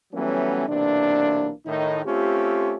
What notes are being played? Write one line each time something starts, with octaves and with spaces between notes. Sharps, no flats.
E3 F#3 G3 A3 B3 C#4
B1 C3 E3 A#3 D4
A2 D#3 D#4
A3 C4 C#4 F4 G4